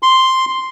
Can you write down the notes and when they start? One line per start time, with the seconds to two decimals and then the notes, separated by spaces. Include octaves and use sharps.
0.03 C6